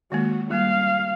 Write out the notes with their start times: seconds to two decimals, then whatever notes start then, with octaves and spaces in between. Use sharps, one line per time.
0.12 D#3 G#3 A#3 F#4
0.51 G3 A#3 F5